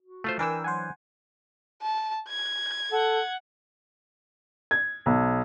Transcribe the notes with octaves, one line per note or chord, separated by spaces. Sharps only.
F#4
A3 F4 C5
E3 D4 A#4 G5 G#5 E6
F#3 C5 F#5 G#5
A5
G#6
A4 F#5
G#6
B1